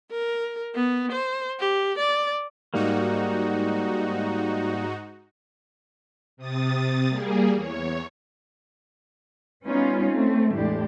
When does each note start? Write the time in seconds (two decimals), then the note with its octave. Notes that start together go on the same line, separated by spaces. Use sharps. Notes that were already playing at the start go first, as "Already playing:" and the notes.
0.11 A#4
0.75 B3
1.12 C5
1.60 G4
1.99 D5
2.74 G#2 G3 A#3 D#4 F#4
6.37 C3 D#6 A6
7.08 G3 A#3 G#4
7.53 E2 C#5
9.64 G3 B3 C#4 D#4 F4
10.10 A3 C4
10.51 E2 A2 G#3 D4 G4